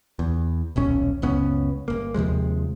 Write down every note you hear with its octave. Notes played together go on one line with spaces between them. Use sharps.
E2
D#1 B1 C#4
F#1 C#2 B3 C#4
G1 A#3
D#2 C3 F3 G#3